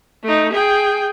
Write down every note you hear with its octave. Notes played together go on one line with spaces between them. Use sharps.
A3 D#4
G#4 G5